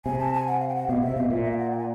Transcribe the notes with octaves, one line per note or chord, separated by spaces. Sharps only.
C3 G#5
A5
G#5
F#5
F5
G5
F#5
B2 F5
C3 E5
B2 F5
A#2 E5
E5
F5
F#5
G5
G#5